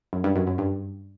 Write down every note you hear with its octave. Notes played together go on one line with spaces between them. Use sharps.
F#2
G2
F#2
F#2
G2